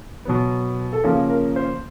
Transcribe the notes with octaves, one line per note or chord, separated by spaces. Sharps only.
B2 F#3 B3
A4
C#3 F3 A#3 C#4 A#4
A#4
C5